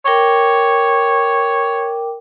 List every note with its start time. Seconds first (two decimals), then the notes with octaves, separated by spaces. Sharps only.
0.05 A#4 C#5 G5 D6